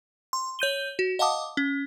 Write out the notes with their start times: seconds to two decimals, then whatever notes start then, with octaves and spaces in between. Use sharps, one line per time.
0.33 C6
0.59 C#5 G6 D#7 G7
0.99 F#4
1.19 D#5 F5 F#5 A5 D6 D#6
1.57 C#4